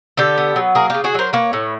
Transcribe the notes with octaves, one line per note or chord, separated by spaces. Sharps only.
D3 G4 A4
B3
F#3
A#3 G#4 A#4
C#3 F4 G4
F#4 G#4
F#3 A#4 C5
A#3 B4 C#5
A2